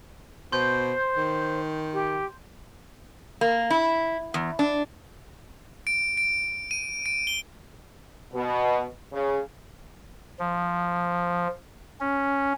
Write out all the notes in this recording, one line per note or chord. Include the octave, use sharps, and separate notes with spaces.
B2 C5 C6 G6
D#3
G4
A#3
E4
E2
D4
D7
D7
D#7
D7
G7
B2
C#3
F3
C#4